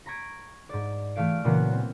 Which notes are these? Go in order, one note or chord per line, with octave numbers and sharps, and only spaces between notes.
A#5 B5 C#6 G#6 D7 D#7
G#2 D5
E3 A3 F5 D7
A#2 C#3 E3 F#3 A#3 B3
C4